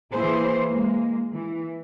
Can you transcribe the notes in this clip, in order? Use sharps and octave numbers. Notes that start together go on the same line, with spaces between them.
E3 A#3 E4 G#4 C5
G#3 A#3
E3